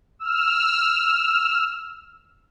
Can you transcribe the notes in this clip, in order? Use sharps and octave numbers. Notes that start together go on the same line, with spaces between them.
E6 F6